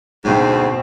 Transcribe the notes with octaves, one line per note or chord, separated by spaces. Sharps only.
D2 G#2 B2 C4